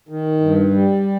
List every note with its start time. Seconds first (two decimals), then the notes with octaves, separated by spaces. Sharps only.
0.09 D#3
0.40 G2
0.71 G3